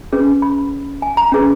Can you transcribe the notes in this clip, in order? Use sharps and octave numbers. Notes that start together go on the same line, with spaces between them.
C#4 G#4 B4
B5
G#5
A#5
C#4 G#4 B4